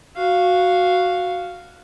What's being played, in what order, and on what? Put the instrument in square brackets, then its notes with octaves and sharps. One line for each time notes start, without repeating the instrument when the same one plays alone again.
[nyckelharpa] F#4 F5